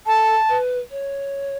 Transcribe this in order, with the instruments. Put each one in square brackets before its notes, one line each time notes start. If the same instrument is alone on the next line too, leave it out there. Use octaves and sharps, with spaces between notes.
[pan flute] A4 [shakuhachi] A5
[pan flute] B4
C#5